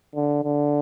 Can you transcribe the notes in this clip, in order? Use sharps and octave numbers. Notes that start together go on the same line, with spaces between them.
D3
D3